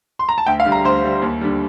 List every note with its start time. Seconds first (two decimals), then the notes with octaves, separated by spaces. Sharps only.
0.19 C6
0.29 A#5
0.38 A5
0.46 D2 G5
0.60 F5
0.65 D3 G3
0.72 A#5
0.84 D2 C5
1.04 D3 G3
1.22 D#2
1.41 D3 G3